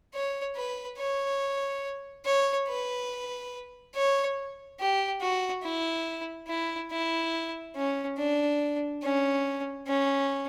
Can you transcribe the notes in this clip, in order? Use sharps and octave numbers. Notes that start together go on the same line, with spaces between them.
C#5
B4
C#5
C#5
B4
C#5
G4
F#4
E4
E4
E4
C#4
D4
C#4
C#4